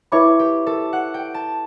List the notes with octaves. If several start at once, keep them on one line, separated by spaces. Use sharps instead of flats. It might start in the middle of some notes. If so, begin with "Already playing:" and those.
E4 B4 C#5 E5 B5 D6
G4
A4
F#5
G5
A5